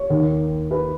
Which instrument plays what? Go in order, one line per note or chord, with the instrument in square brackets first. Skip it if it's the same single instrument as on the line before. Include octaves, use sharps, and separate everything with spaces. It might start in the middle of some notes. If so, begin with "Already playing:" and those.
Already playing: [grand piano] C#5
D#2 D#3
B4